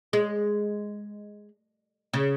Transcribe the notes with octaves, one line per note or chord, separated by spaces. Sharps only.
G#3
C#3